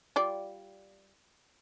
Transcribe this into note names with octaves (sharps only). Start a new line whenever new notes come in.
G3 F4 D5